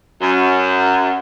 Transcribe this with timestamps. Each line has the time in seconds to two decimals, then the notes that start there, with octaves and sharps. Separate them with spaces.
0.21 F#2